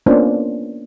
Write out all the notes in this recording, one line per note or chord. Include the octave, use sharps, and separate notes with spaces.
A#3 B3 C#4 D4 F4 C5